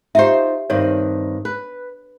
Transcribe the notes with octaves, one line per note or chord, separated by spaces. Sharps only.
D#4 F4 G4 C5 E5
G2 D#3 C4 C#5
B4